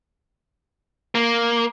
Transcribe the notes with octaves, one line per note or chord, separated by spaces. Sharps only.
A#3